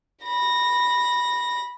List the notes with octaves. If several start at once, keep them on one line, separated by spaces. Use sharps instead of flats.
B5 A#6